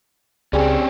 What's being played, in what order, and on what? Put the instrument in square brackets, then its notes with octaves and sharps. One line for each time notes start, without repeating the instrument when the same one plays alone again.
[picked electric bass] C#2 [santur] G3 G#5 E6 [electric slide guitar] C4 C#4 [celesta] G#4